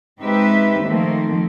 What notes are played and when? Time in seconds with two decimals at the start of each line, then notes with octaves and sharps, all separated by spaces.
0.20 G#3 C4 D#4 G4 B4 E5
0.84 D#3 F3 A3 A#3 C4